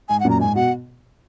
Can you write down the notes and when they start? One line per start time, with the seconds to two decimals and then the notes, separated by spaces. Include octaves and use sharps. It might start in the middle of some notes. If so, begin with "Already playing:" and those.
0.09 G#2 G#5
0.20 F#2 A#2 F#5
0.30 A#5
0.40 G#2 G#5
0.55 B2 F#5